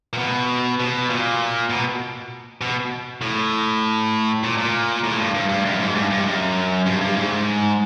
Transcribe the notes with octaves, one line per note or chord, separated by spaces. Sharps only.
A#2
B2
B2
A#2
B2
B2
A2
A#2
A#2
A2
G2
G2
G2
F#2
G#2
G2
G2
F#2
G2
G2
G#2